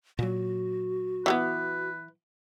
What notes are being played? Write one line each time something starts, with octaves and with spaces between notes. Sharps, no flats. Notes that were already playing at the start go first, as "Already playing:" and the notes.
A#2 F#3 F#4
E3 G3 B3 B4